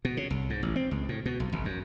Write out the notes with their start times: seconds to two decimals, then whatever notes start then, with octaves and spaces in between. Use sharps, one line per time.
0.05 B2
0.17 C#3
0.30 C2
0.50 G#2
0.63 A1
0.76 C4
0.91 C#2
1.09 A2
1.26 B2
1.40 B1
1.52 G#1
1.65 F#2